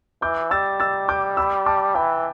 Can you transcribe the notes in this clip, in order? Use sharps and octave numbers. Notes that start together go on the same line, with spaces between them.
E3 D6 G6
G3 E6 A6
E6 A6
D6 G6
B5 E6
A5 D6
E3 G5 B5